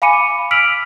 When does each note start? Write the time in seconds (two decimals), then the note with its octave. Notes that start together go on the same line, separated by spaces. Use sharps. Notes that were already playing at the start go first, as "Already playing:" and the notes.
0.02 F5 G#5 B5 D6 C#7 D#7
0.13 D6
0.51 E6 F6 B6 D7 F7 F#7